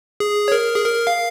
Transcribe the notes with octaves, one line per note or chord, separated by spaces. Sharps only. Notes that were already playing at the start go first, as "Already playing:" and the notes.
G#4
C#5
A#4
G#4
A#4
F5